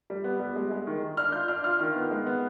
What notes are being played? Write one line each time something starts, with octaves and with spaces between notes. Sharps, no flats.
G3
B3
G3
G#3
G#3
D#3
D#3
D4 F6
F4 G6
D4 F6
F4 F6
D#3 F6
B3
G#3
B3